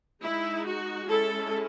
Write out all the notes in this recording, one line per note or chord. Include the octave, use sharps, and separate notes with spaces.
G#3 D#4 E4
F#4
G#3 C#4 E4 A4